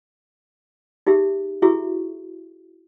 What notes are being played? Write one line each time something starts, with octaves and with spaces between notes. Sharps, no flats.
D#4 G4 G#4 E5
E4 F#4 G#4 E5 C#6